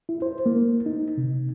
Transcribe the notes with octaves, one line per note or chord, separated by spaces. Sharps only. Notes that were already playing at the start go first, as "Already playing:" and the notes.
E4
C5
A#3
D#4
C3